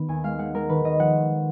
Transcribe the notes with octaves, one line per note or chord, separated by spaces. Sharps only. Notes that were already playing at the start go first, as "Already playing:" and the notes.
Already playing: D#3 B3
D#2 G#5
G#3 F5
G#3 F#5
G#3 A#4
D#3 B4
D#3 D#5
F3 F#5